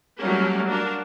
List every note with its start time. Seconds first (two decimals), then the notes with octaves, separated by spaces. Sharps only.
0.19 F#3 G3 A3 A#3 C#4 A#4
0.67 A#3 D4 F#4 A#4